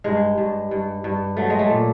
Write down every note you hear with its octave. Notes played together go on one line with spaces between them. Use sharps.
G2 G#3
G2
G2
G2
F#3 A3
G#3
A3
A#2